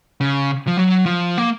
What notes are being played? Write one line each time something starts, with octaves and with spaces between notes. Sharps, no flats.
C#3
F3
F#3
F3
A#3